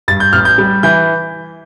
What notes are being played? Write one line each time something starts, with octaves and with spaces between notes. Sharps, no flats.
G2 A6
G6
A1 F6
G6
G3
E3 G6